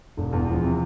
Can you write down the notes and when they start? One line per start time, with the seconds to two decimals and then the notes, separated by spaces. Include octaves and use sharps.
0.17 E1
0.33 E2
0.48 F3
0.63 C3